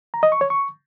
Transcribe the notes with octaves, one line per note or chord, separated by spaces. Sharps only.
A#5
D#5
C#6
C#5
C#6